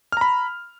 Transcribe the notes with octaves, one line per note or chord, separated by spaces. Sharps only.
A#5 B5 F6